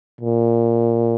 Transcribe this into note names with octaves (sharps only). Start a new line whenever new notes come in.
A#2